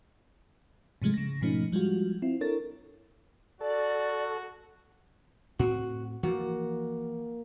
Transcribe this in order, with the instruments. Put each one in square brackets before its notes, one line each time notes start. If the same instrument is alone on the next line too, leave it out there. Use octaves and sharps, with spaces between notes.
[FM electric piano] G#2 C3 F3 G#3 A3
C#3 A#6
G#2 B2 F3 A3 C#4 D#4
F3 G3 G#3 F4 F#4
C4 E4 F4
D4 E4 A4 A#4 C#5 A6
[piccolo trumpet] F#4 [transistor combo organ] A4 [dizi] D5
[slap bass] A2 C4 [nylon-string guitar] F#4
[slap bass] E3 F3 [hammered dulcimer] A#3 [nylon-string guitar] F#4